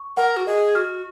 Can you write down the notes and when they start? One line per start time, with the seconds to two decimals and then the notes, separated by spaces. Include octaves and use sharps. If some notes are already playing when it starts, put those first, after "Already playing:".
Already playing: C#6
0.17 A#4 F#5
0.37 F#4
0.47 G#4 D#5
0.75 F#4 F6